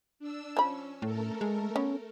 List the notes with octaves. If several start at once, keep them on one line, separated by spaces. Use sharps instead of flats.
D4 E6
F3 C#4 B5
A2 A3 A4 A#4
G#3
B3 C#4